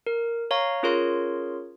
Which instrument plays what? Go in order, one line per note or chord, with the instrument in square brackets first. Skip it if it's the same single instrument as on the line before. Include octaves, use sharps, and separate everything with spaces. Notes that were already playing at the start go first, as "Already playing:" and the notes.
[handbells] A#4
C#5 F5 A#5 C#6
C#4 F4 G#4 A#4 C#5 C6